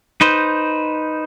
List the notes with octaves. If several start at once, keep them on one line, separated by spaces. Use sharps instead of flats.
D#4 B4 C5